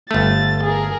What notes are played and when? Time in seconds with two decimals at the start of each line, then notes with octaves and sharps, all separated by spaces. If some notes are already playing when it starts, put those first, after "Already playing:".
0.11 G1 A3 A6
0.64 G#4 A#4